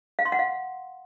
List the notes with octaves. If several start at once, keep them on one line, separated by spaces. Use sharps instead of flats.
F5
C6
F#5
F5